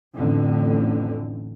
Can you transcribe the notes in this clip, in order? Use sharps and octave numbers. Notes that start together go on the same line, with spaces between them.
A1 F2 A2 D3